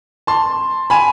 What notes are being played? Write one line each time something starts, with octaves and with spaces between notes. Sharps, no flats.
A5 C6
G#5 B5